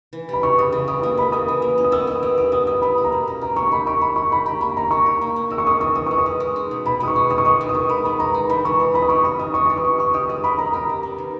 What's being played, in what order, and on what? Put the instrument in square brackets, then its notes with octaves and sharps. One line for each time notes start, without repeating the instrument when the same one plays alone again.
[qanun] E3
[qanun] G3 [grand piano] B5
[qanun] C#3 [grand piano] C#6
[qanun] C#3 [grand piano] D#6
[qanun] E3
[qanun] G3 [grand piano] D#6
[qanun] A#3 [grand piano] D#6
[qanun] C#4 [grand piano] B5
[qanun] E3 [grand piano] D#6
[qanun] E3
A#3
C#4
[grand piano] D#6
[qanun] B3 [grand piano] E6
[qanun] E4
[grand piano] D#6
[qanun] G3
[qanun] G3 [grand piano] D#6
[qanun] B3 [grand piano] D#6
[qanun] E4 [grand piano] D#6
[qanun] G3 [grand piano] B5
[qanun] A#3
[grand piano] A#5
[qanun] B2
C#4
[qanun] G3 [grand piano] A#5
[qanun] A#3 [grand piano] C#6
[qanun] D#4 [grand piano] B5
[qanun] G4 [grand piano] C#6
[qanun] G#3 [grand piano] B5
[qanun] G#3 [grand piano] C#6
[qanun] D#4 [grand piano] B5
[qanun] G4 [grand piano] A#5
[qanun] A#3 [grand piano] B5
[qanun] D#4 [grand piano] A#5
[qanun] G3 [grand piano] C#6
[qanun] G4
A#3
D#4
[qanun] G#3 [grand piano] E6
[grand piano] C#6
[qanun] C#4 [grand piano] D#6
[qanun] E3 [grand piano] C#6
[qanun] E3 [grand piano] D#6
[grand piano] C#6
[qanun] G#3
[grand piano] D#6
[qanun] C#4
G#3
D#4
B2
[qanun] B2 [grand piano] B5
[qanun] G#3 [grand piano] D#6
[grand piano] C#6
[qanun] D#4
[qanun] G#3 [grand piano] D#6
[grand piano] C#6
[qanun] B3 [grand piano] D#6
[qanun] D#3
[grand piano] D#6
[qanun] D#3 [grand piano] C#6
[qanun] G#3 [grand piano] B5
[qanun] B3 [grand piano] B5
[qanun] G#3 [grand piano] A#5
[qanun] D#4 [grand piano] A#5
[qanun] E3 [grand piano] B5
[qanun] E3 [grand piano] C#6
[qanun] G#3 [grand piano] D#6
[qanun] D#4 [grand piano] B5
[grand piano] D#6
[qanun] G3 [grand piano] C#6
[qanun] C#4 [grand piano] D#6
[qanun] E3 [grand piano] D#6
[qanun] E3 [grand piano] C#6
[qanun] G3 [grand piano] D#6
[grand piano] C#6
[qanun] C#4
[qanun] C#4 [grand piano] C#6
[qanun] G4 [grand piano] D#6
[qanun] G#3 [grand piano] D#6
[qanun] A#4 [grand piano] B5
[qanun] C#4 [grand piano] A#5
[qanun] G4 [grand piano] A#5
[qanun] G3
B3
D#3